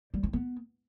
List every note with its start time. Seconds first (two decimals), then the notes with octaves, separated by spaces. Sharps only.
0.14 G3
0.23 C4
0.33 B3